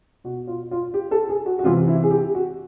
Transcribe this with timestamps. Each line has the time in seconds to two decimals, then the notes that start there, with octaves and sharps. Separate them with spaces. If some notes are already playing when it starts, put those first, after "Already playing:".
0.24 B2 F#4
0.47 F4
0.71 F4
0.94 G4
1.11 A4
1.29 G#4
1.46 F#4
1.59 F#4
1.63 C3 E3 F4
1.88 E4
2.03 G#4
2.10 G4
2.35 F#4